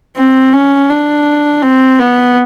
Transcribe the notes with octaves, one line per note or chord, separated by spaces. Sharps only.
C4
C#4
D4
C4
B3